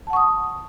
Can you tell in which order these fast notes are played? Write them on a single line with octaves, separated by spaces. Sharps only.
A5 F#5 C#6 D#6